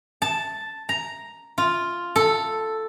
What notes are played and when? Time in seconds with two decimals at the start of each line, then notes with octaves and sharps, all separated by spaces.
0.22 A5
0.89 A#5
1.58 F4
2.16 A4